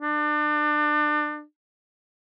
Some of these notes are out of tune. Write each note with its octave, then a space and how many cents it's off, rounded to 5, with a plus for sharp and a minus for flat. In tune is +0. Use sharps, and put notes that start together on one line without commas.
D4 +30